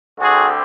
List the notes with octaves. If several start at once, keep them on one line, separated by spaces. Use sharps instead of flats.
D2 D3 G3 C4 F#4 G#4